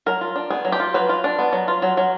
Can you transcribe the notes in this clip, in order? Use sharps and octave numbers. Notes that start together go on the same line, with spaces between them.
F#3 A#4
F4
D4
B3 G#4
F#3
G4
F4
F#3 B4
F4
D4
B3
F#3
F4
F#3
F#3